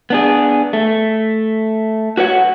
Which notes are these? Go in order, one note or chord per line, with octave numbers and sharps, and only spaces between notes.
B3 D4 G#4
A3
F#4 B4 C#5 F#5